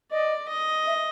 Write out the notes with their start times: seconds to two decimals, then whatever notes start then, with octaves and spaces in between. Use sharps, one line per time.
0.11 D5 D#5
0.49 D#5
0.87 E5